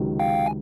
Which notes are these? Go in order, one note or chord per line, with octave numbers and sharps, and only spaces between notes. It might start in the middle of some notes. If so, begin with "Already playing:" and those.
Already playing: C#2 C3 D#3 F#3
F5 G5
G#5